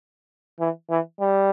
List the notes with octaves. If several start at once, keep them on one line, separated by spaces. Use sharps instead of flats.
E3
E3
G3